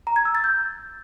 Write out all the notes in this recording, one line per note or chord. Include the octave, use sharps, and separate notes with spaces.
A#5
G#6
E6
A6
G6